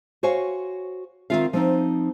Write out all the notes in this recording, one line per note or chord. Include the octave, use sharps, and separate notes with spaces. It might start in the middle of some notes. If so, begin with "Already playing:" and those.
F#4 C5 C#5 F5 G#5
D#3 E3 C4 F4 E5 F5
F3 C4 D#4